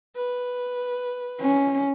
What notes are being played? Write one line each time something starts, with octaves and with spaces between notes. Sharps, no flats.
B4
C#4